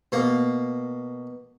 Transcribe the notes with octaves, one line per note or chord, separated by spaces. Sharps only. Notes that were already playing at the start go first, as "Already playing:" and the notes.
B2 A#3